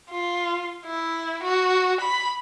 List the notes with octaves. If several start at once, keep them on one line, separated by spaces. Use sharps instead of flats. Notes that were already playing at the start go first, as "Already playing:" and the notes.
F4
E4
F#4
B5